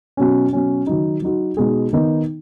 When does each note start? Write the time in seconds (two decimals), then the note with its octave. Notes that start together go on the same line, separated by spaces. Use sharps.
0.17 B2 F#3 C#4
0.53 B2 F#3 C#4
0.87 D#3 F#3 D#4
1.22 F#3 D#4 F#4
1.57 B2 G#3 D#4 G#4
1.93 D#3 B3 D#4